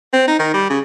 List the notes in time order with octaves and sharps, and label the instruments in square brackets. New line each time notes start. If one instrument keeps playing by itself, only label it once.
[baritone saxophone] C4
D#4
D#3
G3
C#3